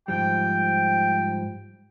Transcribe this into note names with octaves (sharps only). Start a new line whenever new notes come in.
G#2 F3 G3 G5